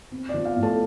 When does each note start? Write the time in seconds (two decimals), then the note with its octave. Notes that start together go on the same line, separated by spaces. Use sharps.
0.11 C4
0.29 F3 D5
0.45 F5
0.56 A2
0.63 A4 A5